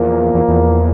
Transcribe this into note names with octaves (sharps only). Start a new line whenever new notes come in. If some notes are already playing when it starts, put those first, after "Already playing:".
Already playing: E2 A#2 F3 A#3
E2
E2